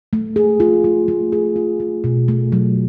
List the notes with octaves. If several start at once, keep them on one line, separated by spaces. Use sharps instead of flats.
A3
G#4
F4
A3
A3
G#4
F4
A3
B2
A3
F#3